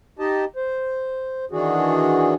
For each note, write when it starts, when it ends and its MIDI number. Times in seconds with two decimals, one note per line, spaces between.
0.19 0.45 63
0.19 0.45 67
0.19 0.45 75
0.19 0.45 81
0.56 1.45 72
1.51 2.34 51
1.51 2.34 52
1.51 2.34 62
1.51 2.34 66
1.51 2.34 68